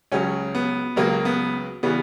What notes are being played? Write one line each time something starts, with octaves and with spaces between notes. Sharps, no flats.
C#2 C#3 F#3 C#4
B3
C#2 C#3 F#3 A#3
B3
C#3 E3 G3 B3